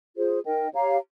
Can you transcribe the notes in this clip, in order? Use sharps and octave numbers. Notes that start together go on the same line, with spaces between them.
F4 G#4 C5
D#4 A#4 D#5 G5
G4 C#5 F5 A#5